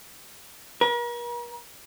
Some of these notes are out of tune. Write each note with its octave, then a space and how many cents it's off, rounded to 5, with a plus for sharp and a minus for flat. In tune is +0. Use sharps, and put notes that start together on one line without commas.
A#4 +45